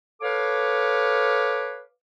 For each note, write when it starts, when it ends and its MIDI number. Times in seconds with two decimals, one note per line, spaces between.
0.21 1.82 69
0.21 1.82 71
0.21 1.82 73
0.21 1.82 77
0.21 1.82 86